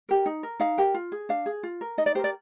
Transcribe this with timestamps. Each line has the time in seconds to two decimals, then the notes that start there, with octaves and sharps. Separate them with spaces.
0.09 G4 A#4
0.26 D#4
0.43 A#4
0.60 D#4 F5
0.78 G4 A#4
0.94 F4
1.12 G#4
1.29 D4 F5
1.46 G#4
1.63 F4
1.81 A#4
1.98 D#4 D#5
2.06 D5
2.15 G4 C5
2.19 A#4
2.24 D5